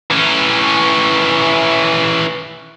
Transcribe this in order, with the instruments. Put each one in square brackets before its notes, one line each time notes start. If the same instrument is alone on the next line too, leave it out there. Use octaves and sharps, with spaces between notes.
[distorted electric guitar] E3 C#4